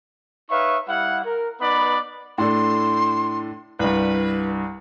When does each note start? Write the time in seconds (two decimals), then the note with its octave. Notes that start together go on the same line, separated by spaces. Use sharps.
0.51 D#4 B4 C#5 E5 F5 C#6
0.88 G3 E4 F5 F#5
1.25 A#4
1.61 B3 D#4 B4 D5 B5
2.38 A2 D4 A4 C6
3.79 C2 G2 B4